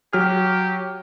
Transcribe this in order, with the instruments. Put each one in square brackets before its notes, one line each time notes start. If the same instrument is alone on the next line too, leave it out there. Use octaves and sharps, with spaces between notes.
[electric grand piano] F#3 F6 [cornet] G4